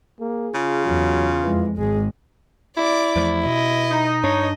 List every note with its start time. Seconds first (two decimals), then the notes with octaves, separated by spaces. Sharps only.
0.20 A#3 G#4
0.55 C#3 F4
0.86 E2 F#3
1.43 F2 E3 G#3
1.78 G#1 G#3 G#4
2.77 E4 D5 D6
3.16 E2 F3 A3
3.46 B2 D#5
3.90 D#4
4.24 G2 D4 C#5 D#5